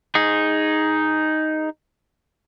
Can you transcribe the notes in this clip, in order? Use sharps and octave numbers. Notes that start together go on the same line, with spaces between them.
D#4 G#4